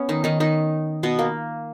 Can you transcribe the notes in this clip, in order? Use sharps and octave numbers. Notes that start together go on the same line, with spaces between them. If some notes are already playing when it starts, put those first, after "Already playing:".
Already playing: B3 C#4
D#3 D#4
D#3 D#4
D#3 D#4
B2 B3
A#3